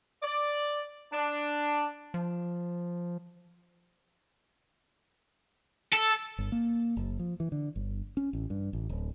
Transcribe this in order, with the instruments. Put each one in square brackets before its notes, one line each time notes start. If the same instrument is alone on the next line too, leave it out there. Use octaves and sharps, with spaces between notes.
[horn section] D5
D4
[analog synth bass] F3
[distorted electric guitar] A4
[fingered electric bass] G1
A#3
F#1
F3
E3
D3
G1
C#4
A1
G2
A1
D1